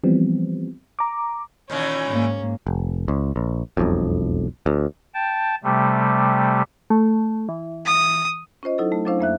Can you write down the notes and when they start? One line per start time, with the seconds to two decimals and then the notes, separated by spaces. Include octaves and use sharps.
0.04 E3 F3 G3 B3 C4
0.99 A#5 D6
1.70 A#2 D#3 E3 C#4
2.07 G#2 A#3
2.67 F1
3.08 C#2
3.36 A#1
3.77 E1 B1 F2
4.66 D2
5.14 G5 A5
5.64 C3 G3 A3
6.90 A3
7.49 E3
7.86 D#6
8.63 C#4 F4 C5 D#5
8.78 F#3 D#4 E4 A4
8.92 A3
9.06 F#3 C#4 D4 E4 C5 F5
9.19 F2 A#3 E5 F#6